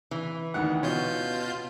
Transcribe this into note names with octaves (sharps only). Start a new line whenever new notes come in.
E3
D2 D#3 F#5
B2 C#4 F4 G6